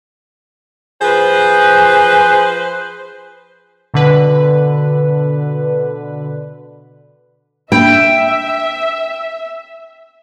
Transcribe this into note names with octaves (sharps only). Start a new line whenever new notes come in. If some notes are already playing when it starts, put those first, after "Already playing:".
F3 G#4 B4 C5
B2 D3 B4
A#3 D4 E5 G5 B5